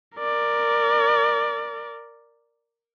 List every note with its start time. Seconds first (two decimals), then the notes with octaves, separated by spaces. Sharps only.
0.18 A#4 D5